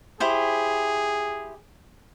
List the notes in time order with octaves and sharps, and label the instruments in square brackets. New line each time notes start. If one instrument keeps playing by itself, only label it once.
[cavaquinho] E4 G4 C5 [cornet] G#4